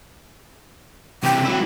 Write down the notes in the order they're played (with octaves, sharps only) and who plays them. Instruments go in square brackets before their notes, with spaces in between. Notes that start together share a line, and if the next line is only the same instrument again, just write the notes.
[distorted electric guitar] C3 E3 [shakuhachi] G5
[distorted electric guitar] F#3 E4